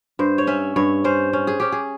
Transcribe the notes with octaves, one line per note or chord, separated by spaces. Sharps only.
G2 C5
C#5
C#4 E5
G2 C#5
C#4 C5
C#4
G#4
C#4 G4
G#4